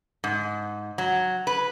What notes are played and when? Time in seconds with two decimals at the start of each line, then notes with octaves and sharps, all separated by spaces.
0.24 G#2
0.98 F#3
1.47 B4